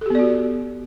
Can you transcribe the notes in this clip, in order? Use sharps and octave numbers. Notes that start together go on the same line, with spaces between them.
B3 F#4 G4 A4 D5